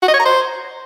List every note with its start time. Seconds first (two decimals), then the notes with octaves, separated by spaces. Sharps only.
0.02 F#4
0.08 D#5
0.14 C#5
0.20 A#5
0.25 C5